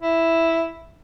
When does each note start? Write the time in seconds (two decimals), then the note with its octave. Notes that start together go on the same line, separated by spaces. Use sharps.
0.02 E4